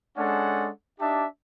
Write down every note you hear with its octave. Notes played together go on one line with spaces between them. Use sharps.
G#3 C#4 D4 A4 F#5
D4 D#4 G4 E5 A5